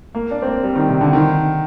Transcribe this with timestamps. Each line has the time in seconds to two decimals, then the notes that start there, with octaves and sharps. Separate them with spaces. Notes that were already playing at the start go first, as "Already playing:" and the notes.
0.15 A#3
0.31 D4
0.42 C4
0.47 A#3
0.64 G3
0.75 D#3
0.88 C3
1.01 D3
1.13 D#3